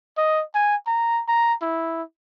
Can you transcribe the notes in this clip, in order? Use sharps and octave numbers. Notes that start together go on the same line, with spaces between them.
D#5
G#5
A#5
A#5
E4